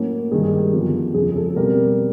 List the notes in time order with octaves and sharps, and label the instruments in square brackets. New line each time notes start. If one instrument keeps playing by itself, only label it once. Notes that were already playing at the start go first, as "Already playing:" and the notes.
Already playing: [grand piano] A2 F#3 A#3 C#4
G2 D#3 G#3 G#4
G#4
G4
F#2 D3 F3 G#3 B3
F2 C#3 F3 G#3 C#4 G#4
G#4
A4
A4
B2 G3 C4 A#4